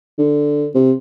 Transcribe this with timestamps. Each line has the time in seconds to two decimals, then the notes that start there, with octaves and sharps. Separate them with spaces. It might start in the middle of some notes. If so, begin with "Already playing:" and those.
0.18 D3
0.75 C3